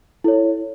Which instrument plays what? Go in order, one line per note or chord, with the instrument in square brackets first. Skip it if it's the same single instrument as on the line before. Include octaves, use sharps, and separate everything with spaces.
[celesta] E4 A4 C#5